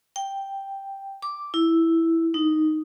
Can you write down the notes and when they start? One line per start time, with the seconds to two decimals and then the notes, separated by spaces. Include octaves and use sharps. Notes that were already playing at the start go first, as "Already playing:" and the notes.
0.16 G5
1.22 D6
1.54 E4
2.34 D#4